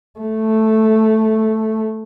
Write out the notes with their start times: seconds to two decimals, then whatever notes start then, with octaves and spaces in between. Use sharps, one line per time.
0.20 A3